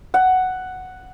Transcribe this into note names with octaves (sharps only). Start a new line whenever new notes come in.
F#5